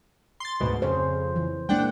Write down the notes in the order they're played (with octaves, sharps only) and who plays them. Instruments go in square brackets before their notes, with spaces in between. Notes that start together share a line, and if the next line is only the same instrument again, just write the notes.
[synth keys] C6 A6
D2 G#2 B2
[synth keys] F2 C#3 [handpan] C5
[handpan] E3
[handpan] G#3 A#3 [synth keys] D4 F#5 G5